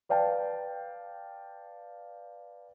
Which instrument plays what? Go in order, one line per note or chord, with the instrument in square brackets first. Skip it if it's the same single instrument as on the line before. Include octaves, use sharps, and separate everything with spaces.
[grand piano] B4 D5 F5 G5 A5